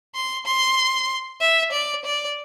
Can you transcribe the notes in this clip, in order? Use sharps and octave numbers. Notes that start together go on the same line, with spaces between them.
C6
C6
E5
D5
D5